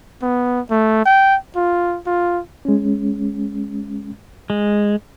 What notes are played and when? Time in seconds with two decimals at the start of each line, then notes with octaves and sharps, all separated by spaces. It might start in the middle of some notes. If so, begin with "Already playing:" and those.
0.22 B3
0.71 A3
1.05 G5
1.56 F4
2.06 F4
2.65 G#3 C#4
4.50 G#3